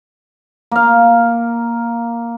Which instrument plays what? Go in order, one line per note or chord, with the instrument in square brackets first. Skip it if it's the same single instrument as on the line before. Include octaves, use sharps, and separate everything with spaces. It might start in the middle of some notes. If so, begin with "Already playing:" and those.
[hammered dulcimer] A#3 F5